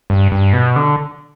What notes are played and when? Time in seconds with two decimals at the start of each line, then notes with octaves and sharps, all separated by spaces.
0.10 G2
0.32 G2
0.53 B2
0.76 D3